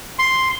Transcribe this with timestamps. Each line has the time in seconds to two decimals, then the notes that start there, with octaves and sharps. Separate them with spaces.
0.19 C6